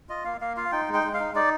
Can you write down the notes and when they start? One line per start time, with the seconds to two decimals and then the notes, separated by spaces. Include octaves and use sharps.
0.09 F4 D#5
0.25 A#3 F5
0.41 A#3 F5
0.57 F4 F5
0.72 D#4 G5
0.88 G#3
0.94 G5
1.04 G#3
1.14 F5
1.20 D#4
1.35 D#4 D5